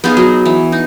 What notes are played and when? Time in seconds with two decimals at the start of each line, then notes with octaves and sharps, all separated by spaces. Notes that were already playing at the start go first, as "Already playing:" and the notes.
0.04 B3 D#4 F4 G#4
0.17 F#3
0.45 E3
0.72 D#4